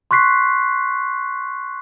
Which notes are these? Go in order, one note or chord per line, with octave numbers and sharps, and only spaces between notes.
C6 C#6 F#6 B6 C7